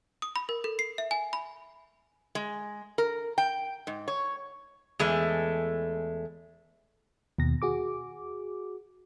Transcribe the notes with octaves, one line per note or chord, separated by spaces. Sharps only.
D#6
B5
A#4
A4
C7
E5
G#5
B5
G#3
A#4
G5
G#2
C#5
E2 G#3 A3
D#2 B2 A#6
F#4 G#4 D6